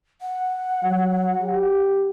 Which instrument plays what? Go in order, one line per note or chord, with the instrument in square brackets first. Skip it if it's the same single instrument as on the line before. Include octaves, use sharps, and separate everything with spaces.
[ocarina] F#5
[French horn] F#3
G4